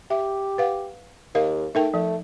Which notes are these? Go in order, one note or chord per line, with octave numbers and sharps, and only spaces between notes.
G4 E5
B4 F5 F#5
D#2 A#4 D#5 F5
A3 D#4 A#4 G5
F3 A3